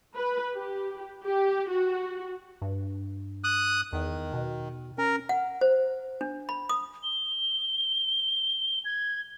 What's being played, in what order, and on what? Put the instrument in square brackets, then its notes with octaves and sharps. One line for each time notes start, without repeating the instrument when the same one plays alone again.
[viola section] B4
G4
G4
F#4
[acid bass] G2
[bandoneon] D#6 F#6
[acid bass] E2 [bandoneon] D#3
[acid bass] B2
[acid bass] C#4 [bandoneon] A#4
[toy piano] F#5
C5
D4
B5
D#6
[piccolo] G7
G#6